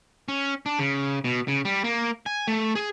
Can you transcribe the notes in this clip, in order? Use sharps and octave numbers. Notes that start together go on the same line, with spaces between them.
C#4
D4
C#3
B2
C#3
G3
A#3
G#5
A3
G#4